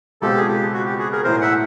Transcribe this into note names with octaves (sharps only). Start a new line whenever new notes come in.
C#2 B2 G#3 C4 F4 G4 A4
G#4
G4
F#4
G4
F#4 G#4
G#4 A#4
B1 A2 E3 A#4 C5
E5 F#5